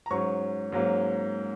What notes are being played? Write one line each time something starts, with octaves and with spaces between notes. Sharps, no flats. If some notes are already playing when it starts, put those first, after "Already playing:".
A#5
G#2 F#3 C#4 C#6
G#2 F#3 A#3 C#4